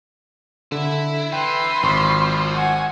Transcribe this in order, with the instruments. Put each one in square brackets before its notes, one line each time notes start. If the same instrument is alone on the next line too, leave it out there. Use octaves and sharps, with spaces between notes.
[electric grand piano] D3 [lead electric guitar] E4
[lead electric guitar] E3 [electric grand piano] G5 [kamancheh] B5 C6
[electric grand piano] G#1 C#6 [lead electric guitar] F3
[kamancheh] F#5 G#5